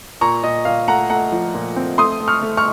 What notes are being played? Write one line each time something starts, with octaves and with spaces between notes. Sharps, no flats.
A#2 A#5 C#6
A#2 D#5
A#2 F5
A3 F#5 A#5
A3 F#5 A#5
F3
A#2
C4
A3 C6 D#6
A3
C#6 F6
A3
C#6 F6